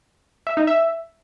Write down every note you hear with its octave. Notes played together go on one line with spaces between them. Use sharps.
E5
D#4
E5